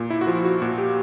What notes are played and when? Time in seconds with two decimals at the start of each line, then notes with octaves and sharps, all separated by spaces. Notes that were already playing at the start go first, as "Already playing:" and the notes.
Already playing: A#2
0.10 E4
0.21 F#4
0.27 F3 F4
0.45 F#4
0.62 A#2 F#4
0.78 G4